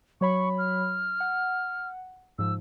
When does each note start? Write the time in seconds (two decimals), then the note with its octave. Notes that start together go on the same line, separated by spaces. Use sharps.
0.21 F#3 C#5 B5 C#6
0.58 F6
1.20 F#5
2.39 G#2 F3 E6